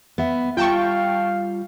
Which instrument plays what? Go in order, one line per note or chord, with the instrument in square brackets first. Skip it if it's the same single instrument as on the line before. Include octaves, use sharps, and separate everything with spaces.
[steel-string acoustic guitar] B3 E5
[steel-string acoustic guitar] G3 [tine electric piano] F4 [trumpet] F5 [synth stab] G5 A5 C#6